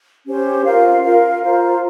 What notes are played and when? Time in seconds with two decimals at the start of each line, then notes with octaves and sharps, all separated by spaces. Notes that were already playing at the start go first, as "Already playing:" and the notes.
0.26 C#4 G4 C5
0.64 F4 A#4 F5
1.03 F4 A#4 F5
1.42 F4 C5 F5 A#5